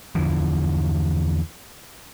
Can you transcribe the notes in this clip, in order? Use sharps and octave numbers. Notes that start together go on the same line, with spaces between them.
E2 D3 E3 F3